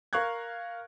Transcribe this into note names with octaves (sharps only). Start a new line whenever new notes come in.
A#4 F5 C#6 F#6 G#6